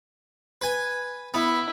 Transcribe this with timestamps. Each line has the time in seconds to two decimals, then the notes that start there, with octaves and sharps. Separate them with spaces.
0.61 B4 G#5
1.34 B3 E4